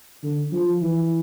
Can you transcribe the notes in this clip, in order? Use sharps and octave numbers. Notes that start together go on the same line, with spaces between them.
D3
F3
E3